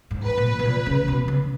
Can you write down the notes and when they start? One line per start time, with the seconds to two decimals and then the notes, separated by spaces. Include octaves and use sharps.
0.11 G#2
0.24 B4
0.38 A#2
0.59 B2
0.65 A#2
0.86 C#3
1.08 B2
1.28 C#3